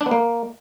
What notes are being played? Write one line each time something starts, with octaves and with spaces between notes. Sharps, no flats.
D4
B3
A#3